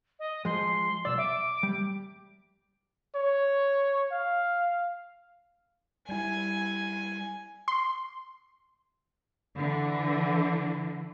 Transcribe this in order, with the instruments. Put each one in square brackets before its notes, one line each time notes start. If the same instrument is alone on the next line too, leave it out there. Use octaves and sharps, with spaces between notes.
[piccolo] D#5
[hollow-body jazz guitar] F3 G#3 [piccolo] C6
[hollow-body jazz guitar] B1 A#2 D5 [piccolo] E6
[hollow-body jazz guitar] E5 [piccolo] D6
[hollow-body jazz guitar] G3
[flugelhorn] C#5
F5
[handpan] G3 E4 [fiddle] G#5
[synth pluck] C6
[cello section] D3 E3